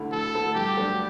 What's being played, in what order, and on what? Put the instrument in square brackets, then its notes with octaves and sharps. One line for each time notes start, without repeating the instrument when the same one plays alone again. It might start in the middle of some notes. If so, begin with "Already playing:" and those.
Already playing: [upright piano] D2 D3 A3 E4
[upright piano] D2 [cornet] A4
[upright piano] D3 A3 E4
[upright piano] G2 [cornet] G4
[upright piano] F#3 A3 D4